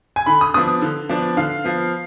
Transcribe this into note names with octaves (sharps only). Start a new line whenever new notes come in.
G#5
D3 B5
D#6
F3 B3 D4 D#6
D3
F3 B3 D4
D3 F5
F3 B3